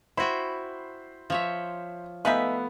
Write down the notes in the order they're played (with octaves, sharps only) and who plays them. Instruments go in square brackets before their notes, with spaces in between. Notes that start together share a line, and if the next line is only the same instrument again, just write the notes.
[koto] E4 F#4 G5 [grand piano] C5 B5 C6
[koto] F3 C#5 E5
[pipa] G#3 D#4 E5 [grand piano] A3 B3 F5 [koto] B4